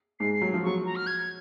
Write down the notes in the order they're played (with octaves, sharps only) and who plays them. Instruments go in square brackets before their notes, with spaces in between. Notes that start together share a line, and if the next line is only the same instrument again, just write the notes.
[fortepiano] G#2 [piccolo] C7
[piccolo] C7
[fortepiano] F#3
F3
[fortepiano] F#3 [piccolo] C#6
[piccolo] A#5
F6
G#6